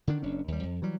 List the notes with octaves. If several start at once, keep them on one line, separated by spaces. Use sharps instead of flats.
D3 D#3 D4
F#1 C#4 D4
D#2 G3
F2
E3 F#3 G3